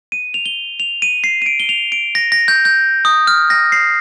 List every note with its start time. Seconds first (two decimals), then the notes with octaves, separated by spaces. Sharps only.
0.12 D#7
0.34 F7
0.46 G7
0.80 F7
1.02 D#7
1.24 C7
1.42 D#7
1.46 D7
1.60 G7
1.69 F7
1.92 D7
2.15 A#6
2.32 A#6
2.48 G6
2.65 G6
3.05 D#6
3.27 F6
3.50 A#6
3.72 C7